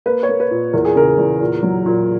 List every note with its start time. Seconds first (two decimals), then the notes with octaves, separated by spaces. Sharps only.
0.06 A#3 B4
0.23 C#5
0.29 A#3
0.40 B4
0.51 A#2
0.73 E2 A#4
0.85 G#4
0.95 C#3 A#4
1.18 E2
1.41 A#2
1.63 F#3
1.86 A#2